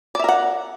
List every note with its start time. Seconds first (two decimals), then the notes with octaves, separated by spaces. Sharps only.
0.15 D5
0.19 E5
0.24 A#4
0.29 F#5